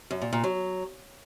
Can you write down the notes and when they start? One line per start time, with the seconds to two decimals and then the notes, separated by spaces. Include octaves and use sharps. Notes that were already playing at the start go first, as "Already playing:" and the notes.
0.11 F#2
0.22 A#2
0.33 A#2
0.44 F#3